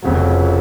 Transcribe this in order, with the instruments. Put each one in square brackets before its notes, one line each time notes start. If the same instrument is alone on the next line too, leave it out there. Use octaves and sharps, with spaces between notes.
[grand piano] F1 F2 C#3 F#3